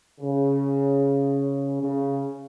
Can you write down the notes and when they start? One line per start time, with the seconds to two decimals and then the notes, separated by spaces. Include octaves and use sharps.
0.21 C#3
1.81 C#3